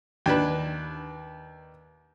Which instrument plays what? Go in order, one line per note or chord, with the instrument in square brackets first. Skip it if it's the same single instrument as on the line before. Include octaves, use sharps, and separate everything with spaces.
[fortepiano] D#2 D4 B4